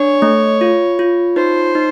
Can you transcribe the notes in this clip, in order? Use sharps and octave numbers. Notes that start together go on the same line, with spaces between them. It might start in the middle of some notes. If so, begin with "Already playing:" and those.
Already playing: D4 C#5
A3
F4
F4
D#4 C5
D#4